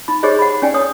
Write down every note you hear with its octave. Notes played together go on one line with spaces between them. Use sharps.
D#4 B5
D#4 G4 G#4 C5 C#5 D#5
F#5 B5
C#4 D#4 D5 G5 G#5
C#5 D#6